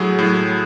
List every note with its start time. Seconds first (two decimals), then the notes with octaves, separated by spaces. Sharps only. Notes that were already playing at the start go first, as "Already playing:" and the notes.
Already playing: A2 F#3 G#4
0.19 A2 F#3